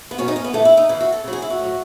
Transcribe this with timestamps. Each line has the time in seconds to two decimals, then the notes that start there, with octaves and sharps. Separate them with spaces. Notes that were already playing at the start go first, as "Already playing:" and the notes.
0.11 B3
0.18 B2 F#3 C#4
0.28 D#4
0.36 C#4
0.44 B3
0.53 A2 E3 A3
0.65 E4
0.77 D#4
0.89 C#3 E3 E4
1.01 F#4
1.12 A4
1.24 C#3 F#3
1.33 G#4
1.42 E4
1.50 F#4
1.59 A2 F#3